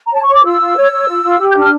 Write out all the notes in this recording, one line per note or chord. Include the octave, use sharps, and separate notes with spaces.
A#5
C#5 A5
C#6
C#5
D6
F4 E6
F4
C#5
C#5
F4
F4
G4
G6
D4 F6